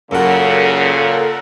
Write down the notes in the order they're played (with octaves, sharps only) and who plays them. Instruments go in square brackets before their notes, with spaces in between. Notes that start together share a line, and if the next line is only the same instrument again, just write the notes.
[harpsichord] F#2 F#4 [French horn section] A#2 C#3 [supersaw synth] A4 A#4 F#5